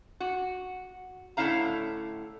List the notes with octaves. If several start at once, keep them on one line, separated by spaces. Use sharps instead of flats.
F#4
A2 D3 C#4 E4 F5 A#5